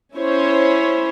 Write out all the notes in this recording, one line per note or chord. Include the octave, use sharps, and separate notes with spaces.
C#4 E4 C5 C#5